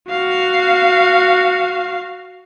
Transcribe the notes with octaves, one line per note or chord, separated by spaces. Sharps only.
F#4 F5